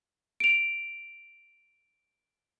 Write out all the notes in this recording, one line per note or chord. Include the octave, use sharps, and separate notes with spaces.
D7 F7